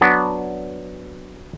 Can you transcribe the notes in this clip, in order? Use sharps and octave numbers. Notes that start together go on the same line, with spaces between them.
F#3 B3 D4